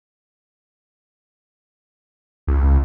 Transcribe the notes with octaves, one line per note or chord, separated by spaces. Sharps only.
C#2